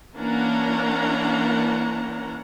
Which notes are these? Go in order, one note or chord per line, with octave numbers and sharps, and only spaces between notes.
E3 A#3 C#4 D4 F#5 A#5